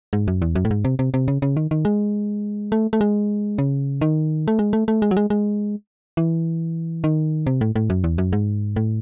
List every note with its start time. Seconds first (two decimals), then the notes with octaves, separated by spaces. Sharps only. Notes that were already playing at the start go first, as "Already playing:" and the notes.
0.13 G#2
0.28 F#2
0.42 E2
0.55 F#2
0.65 A2
0.71 G#2
0.85 C3
0.99 C3
1.14 C3
1.28 C#3
1.42 C#3
1.57 D#3
1.71 D#3
1.85 G#3
2.72 A3
2.93 A3
3.01 G#3
3.58 C#3
4.01 D#3
4.48 A3
4.59 G#3
4.73 A3
4.88 A3
5.02 G#3
5.11 F#3
5.17 G#3
5.30 G#3
6.17 E3
7.04 D#3
7.47 C3
7.61 A2
7.76 A2
7.90 F#2
8.04 E2
8.18 F#2
8.33 G#2
8.76 A2